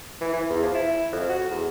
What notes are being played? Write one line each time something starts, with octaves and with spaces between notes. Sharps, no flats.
E3
E3
E2
F3
E4
F2
F#4
E2